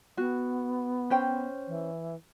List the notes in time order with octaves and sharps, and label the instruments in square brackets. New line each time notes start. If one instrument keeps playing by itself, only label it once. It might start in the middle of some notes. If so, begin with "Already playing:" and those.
[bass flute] B3 [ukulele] F#4
[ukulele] C#4 C5 G5
[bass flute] E3